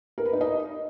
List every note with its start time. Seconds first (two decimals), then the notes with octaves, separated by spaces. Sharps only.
0.18 A#4
0.25 B4
0.33 D#4
0.41 D#5